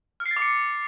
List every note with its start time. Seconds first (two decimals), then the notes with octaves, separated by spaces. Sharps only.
0.20 F6
0.26 C7
0.31 A6
0.37 D6
0.42 C#7